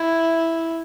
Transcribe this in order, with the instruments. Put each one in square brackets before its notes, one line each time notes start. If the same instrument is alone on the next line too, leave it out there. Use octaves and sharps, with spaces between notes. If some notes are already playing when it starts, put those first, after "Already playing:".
Already playing: [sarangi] E4